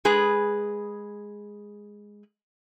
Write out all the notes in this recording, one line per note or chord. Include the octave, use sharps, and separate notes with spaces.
G#3 G#4 B4